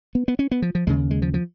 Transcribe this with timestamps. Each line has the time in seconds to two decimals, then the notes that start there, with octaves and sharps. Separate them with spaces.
0.15 B3
0.28 B3
0.39 C#4
0.51 B3
0.62 F3
0.75 F3
0.87 D#2 C#3 G#3
1.11 G#3
1.22 F3
1.34 F3